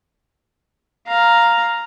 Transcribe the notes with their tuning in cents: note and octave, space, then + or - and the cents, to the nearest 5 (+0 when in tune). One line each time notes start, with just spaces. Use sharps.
F5 +0 A#5 +0